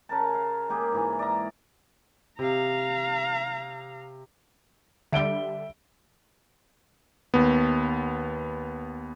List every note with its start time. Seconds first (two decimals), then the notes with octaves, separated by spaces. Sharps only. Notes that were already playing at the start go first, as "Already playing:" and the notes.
0.09 C#3 A#4 A5
0.34 F5
0.69 G#3 A#3 G4 G#4
0.92 G#2 E3 G#4
1.19 D5 E5 A#5
2.39 C3 F5 A#5
5.13 D3 G3 E5 D7 G7
7.34 D#2 B3